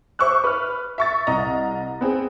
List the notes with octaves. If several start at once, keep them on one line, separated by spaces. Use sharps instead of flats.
C5 E5 C#6 D6 E6 F#6
B4 F6
E5 C#6 A6
C2 D#5 A#5
B3 C4 G#4